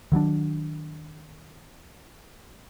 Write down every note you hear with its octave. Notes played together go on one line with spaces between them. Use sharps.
D#3 F#3 A#3 D4